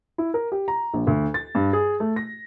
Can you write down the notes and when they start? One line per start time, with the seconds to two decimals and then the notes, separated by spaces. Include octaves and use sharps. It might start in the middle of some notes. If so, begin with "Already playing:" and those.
0.18 E4
0.34 A#4
0.52 G4
0.68 A#5
0.94 A#1
1.07 D2
1.34 A6
1.55 G2
1.73 G#4
2.00 A3
2.16 A#6